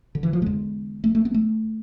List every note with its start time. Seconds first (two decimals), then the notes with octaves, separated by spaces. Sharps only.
0.15 D3
0.23 E3
0.33 F3
0.42 E2 D3 G#3
1.04 A3
1.15 A3
1.25 B3
1.34 A3